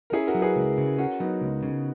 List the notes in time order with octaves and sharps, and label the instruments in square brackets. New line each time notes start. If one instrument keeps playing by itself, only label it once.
[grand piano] A#4
[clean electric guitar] C#4 [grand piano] E4 G#4
[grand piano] F#4 A#4
[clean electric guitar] F#3
[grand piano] G#4 B4
[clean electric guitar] C#2
C#3
[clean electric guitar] C#4 [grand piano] F#4 A#4
[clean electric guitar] F#3 [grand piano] B3 D#4
[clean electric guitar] C#2
C#3